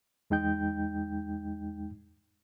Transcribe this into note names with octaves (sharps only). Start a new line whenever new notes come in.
E2 G#3 D#4 G5 G6